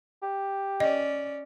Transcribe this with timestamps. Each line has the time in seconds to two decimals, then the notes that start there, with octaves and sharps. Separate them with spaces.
0.22 G4
0.80 C#4 D5 D#5